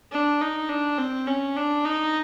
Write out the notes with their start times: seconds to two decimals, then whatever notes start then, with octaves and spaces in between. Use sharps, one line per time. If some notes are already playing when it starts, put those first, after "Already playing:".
0.12 D4
0.41 D#4
0.69 D4
0.98 C4
1.27 C#4
1.57 D4
1.85 D#4